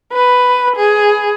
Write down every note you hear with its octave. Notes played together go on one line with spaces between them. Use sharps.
B4
G#4